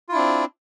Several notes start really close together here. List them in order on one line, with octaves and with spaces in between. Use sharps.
F4 E4 D4 C4